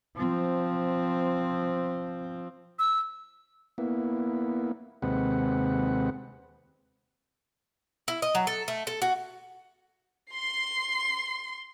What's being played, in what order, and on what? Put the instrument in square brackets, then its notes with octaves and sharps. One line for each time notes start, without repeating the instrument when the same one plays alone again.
[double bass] F3 C4
[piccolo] E6
[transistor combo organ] A#3 B3 E4
D#2 C3 G#3 C4 B4 F#5
[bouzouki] E4
D#5
F#3
A4
A3
A4
F#4
[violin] C6 C7